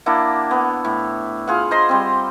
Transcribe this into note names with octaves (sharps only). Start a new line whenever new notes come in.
A#3 D4 E4 F#5
B3
A2
F4 G#4 F5 F#5
C5 D#5 A#5 C6
G3 C4